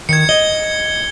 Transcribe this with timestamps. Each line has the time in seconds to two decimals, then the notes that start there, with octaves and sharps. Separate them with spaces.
0.09 D#3 G#6 C#7
0.29 D#5 G7